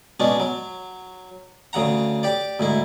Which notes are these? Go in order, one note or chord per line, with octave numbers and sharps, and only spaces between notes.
B2 G#3 C#4 D4
F#3
D2 C#3 F#5 A#5
G4 D5
D2 G#2 E4